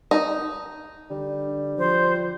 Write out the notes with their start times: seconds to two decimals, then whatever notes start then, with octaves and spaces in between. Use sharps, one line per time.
0.11 D#4
1.10 D3 G3
1.79 F3 C5